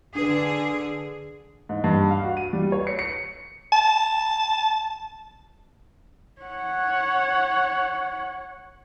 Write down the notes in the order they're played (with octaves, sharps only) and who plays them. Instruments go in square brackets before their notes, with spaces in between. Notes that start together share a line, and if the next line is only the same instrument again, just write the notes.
[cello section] D3 G#4 [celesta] D4 B4
[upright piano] G#2
G2
F5
F#4
D#7
G3
C#5
C#7
C#7
[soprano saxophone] A5
[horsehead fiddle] C#5 F#5